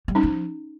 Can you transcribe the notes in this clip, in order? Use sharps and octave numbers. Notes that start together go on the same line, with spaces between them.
G3
C#4 D#4
F3